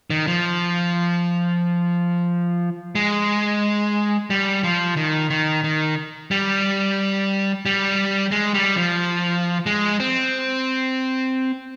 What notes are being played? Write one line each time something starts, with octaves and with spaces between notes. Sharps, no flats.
D#3
F3
G#3
G3
F3
D#3
D#3
D#3
G3
G3
G#3
G3
F3
G#3
C4